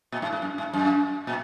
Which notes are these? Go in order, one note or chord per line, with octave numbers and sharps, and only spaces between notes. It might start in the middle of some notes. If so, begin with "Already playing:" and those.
A#2
G#2
G#2
F#2
G#2
F#2
A#2